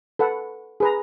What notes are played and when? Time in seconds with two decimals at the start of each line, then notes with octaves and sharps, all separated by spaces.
0.19 A4 B4 F#5
0.80 G#4 B4 A#5